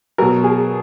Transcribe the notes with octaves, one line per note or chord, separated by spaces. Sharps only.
B2 F#3 A#4
G#4